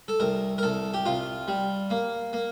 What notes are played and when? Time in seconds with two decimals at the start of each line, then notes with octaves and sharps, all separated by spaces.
0.08 A4
0.20 C2 A#4
0.58 A#4
0.63 C2 A4
0.94 G4
1.05 C2 F4
1.48 G3
1.90 A#3
2.33 A#3